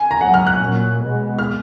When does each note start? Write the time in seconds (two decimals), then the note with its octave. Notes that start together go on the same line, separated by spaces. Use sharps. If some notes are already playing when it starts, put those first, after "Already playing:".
Already playing: G#5
0.11 A#5
0.21 G#2 F#3 C#4 F#5
0.34 F6
0.47 F#6
0.60 A#2 F#3 A#3 C#4
1.00 B2 G#3 B3
1.39 F6